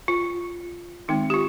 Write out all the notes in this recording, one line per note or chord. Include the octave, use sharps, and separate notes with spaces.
F4
D#3 G#3 C4 D#4
G4
F4